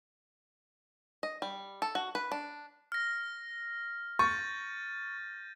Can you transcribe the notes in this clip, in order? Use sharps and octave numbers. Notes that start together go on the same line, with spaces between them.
D#5
G3
A4
F#4
B4
D4
F6 A#6
C#6 G6 A6 D#7